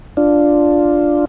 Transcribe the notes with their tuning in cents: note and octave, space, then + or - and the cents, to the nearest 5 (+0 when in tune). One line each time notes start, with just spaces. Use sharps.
D4 +0 F4 +0